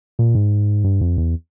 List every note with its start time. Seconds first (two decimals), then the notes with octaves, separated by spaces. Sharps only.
0.19 A#2
0.35 G#2
0.84 G2
1.01 F2
1.18 E2